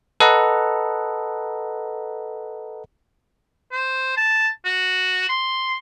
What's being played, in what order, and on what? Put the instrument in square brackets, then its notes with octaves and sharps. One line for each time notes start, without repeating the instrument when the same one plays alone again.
[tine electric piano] A4 B4 D#5 F#5 A#5
[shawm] C5
A5
F#4
C6